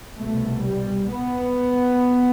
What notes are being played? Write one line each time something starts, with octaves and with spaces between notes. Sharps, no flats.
C2 B2 A3
G3
B3